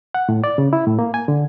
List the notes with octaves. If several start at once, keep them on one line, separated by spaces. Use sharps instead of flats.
F#5
A2
D5
C#3
E4
A2
A#3
G#5
D3